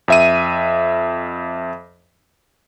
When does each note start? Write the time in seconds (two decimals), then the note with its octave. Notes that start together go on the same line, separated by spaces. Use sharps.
0.08 F2 E5 D#7